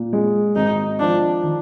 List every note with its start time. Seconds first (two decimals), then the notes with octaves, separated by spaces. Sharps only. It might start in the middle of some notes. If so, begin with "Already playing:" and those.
Already playing: A#2
0.13 G#3
0.56 G#1 D#4
0.99 F3 D4
1.44 D#3